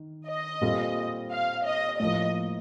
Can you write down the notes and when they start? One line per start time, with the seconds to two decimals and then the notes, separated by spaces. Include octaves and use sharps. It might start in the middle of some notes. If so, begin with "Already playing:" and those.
Already playing: D#3
0.27 D#5
0.61 A#2 G3 C4 F4 A4
1.32 F5
1.65 D#5
2.00 A2 F3 A#3 D#5